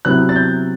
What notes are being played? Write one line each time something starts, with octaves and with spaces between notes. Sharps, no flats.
C3 F#3 B3 E4 F#6
A6
G6